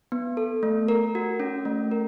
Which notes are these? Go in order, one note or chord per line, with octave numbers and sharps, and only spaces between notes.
B3
A4
A3
A#4
F#4
C#4
A3
A#4